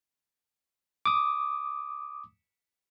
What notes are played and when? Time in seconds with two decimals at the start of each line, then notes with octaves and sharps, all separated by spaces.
1.06 D6 D#6